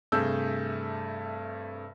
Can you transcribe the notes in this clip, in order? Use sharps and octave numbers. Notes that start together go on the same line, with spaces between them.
G2 C3 A3 G#4 E6 G6